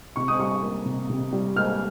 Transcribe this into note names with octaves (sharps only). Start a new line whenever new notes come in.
C3 C#6
D#6
G3 C#6
A#3
C3
C3
G3
A#3 F6